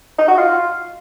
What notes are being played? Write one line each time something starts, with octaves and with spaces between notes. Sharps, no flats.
D#4
F#4
F4